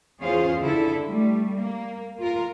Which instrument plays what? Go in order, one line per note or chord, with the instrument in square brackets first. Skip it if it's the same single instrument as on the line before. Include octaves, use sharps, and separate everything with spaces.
[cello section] E2 C#4 F4 G#4 C5 F5
D3 E4 A4
G3 A3
A#3
F4 A#4